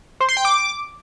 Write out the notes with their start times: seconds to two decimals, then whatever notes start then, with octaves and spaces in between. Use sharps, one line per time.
0.21 C5
0.29 C6
0.37 G5
0.45 D6